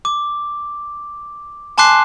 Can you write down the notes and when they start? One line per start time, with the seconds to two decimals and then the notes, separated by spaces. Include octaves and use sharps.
0.05 D6
1.78 G#5 A5 C6 D6 F#6 C7